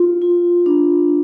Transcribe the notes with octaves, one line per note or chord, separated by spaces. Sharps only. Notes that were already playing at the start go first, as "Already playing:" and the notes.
Already playing: F4
F4
D4